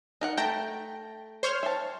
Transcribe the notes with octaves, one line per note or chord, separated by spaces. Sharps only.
D#4 A#4 F#5
A3 G5 A#5
C5 C#5 F6
E5 A5